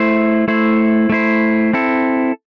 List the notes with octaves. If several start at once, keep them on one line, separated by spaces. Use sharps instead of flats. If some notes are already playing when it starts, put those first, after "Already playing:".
Already playing: A3 E4 C5
A3 E4 C5
A3 E4 C5
C4 E4 A4